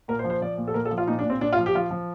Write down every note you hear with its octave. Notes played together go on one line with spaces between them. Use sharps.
A#2 A#4
C5
F3
C5
F3 D5
A#2
A4
A#2 A#4
A4
F3
F4
A#2 D#4
D4
A#2
C4
A#2 D4
F4
F3
G4
F3 F4
F3